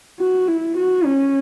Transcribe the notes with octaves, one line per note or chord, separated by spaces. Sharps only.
F#4
E4
F#4
C#4